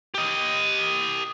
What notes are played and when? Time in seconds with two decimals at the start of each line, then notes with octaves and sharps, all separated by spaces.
0.14 G4 D#5